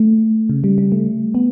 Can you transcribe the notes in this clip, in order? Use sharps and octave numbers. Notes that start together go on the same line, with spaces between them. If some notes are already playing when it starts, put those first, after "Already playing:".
Already playing: A3
C#3
G3
G3
A3
B3